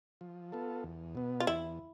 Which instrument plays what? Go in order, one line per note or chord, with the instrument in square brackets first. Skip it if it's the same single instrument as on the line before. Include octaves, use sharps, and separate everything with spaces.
[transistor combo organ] F3
B3 F4 A4
E2
B2 B3
[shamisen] F4
[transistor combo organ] E2 [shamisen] E4